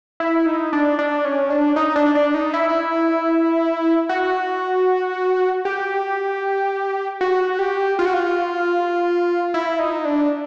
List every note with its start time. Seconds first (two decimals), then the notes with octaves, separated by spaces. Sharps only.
0.20 E4
0.46 D#4
0.73 D4
0.99 D4
1.25 C#4
1.50 D4
1.76 D#4
1.96 D4
2.15 D4
2.34 D#4
2.54 E4
4.09 F#4
5.65 G4
7.21 F#4
7.59 G4
7.99 F4
8.05 F#4
8.14 F4
9.54 E4
9.79 D#4
10.05 D4